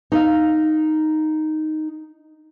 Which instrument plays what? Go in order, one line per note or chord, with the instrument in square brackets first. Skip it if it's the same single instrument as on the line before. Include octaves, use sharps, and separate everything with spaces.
[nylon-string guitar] D#4 D#5 F5